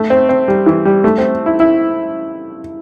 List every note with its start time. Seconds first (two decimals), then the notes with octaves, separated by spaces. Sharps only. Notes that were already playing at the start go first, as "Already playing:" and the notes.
Already playing: A3
0.10 C4
0.29 C4
0.48 G3
0.66 E3
0.85 G3
1.04 A3
1.18 C4
1.46 E4
1.60 E4